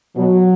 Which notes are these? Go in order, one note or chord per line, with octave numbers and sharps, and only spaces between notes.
B2 F#3